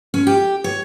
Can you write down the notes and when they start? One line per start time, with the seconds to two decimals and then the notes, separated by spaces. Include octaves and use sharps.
0.14 C#4
0.27 G4
0.64 C#5